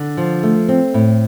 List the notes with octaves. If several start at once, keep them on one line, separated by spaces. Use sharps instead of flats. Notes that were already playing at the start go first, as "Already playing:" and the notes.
Already playing: D3
F3
A3
C4
A2